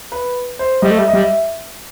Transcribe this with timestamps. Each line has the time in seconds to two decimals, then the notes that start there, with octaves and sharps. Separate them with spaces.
0.12 B4
0.59 C5
0.82 G3 D#5
0.91 A3
0.95 G3 E5
1.08 D#5
1.13 G3
1.21 E5